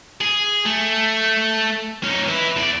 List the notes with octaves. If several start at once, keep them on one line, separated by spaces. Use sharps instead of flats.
G#4
A3
C#4 D#4
B4 E5
E2 D5